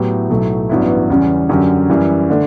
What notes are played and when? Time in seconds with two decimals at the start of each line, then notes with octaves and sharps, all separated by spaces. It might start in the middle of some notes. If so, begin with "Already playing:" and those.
Already playing: A2 F#3 B3 E4 G4
0.30 B1 A2 F#3 A3
0.69 A1 G2 F#3 B3 E4
1.10 E2 C#3 G3 C#4
1.49 F#2 D3 F#3 C#4 G4
1.90 F#2 E3 G3
2.29 D3 A3 D4